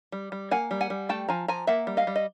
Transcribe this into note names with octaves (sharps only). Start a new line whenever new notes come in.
G3
G3
A#3 F#5 G#5
G3
F#5 G#5
G3
A3 G5 A5
F3 G#5 A#5
F3 G#5 A#5
A#3 E5 F#5
G3
D#5 F5
G3
D#5